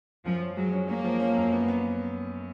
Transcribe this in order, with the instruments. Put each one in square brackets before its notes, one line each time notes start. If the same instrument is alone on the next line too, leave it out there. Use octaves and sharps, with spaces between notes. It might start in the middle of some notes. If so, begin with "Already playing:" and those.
[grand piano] F#2 [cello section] F3
[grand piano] C#4
[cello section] F#3 [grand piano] G#3
[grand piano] C#4
[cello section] A#3 [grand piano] C#4
[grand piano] F3
C#4
F#2
B3
B3